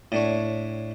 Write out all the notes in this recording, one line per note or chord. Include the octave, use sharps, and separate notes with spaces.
A2 D4 C#5